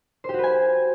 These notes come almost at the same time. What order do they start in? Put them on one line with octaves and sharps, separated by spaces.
C5 G4 F#4 B4 G#5